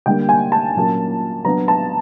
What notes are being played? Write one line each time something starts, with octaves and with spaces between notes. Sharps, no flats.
D3 G3 A#3 G5
G#5
A5
A#2 F#3 A#3 C#4
F#3 B3 D4 A#5
A5